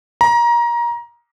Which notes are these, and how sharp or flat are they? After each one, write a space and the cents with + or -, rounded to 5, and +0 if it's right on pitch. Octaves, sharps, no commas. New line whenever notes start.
A#5 +25